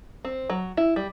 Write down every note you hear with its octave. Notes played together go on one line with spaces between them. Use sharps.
C4
F#3
E4
G3